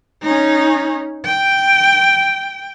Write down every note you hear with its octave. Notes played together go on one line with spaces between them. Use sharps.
C#4 D#4
G5